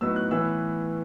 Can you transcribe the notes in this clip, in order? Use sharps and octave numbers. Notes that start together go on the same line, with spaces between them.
A2 F#3 B3 D#4 E6
F#6
A2 E3 B3 E6